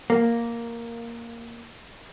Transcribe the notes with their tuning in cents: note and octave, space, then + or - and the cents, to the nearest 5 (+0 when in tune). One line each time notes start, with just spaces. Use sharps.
A#3 +0